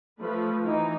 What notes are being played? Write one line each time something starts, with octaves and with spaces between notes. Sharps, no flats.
F3 A3 B4
E3 D#4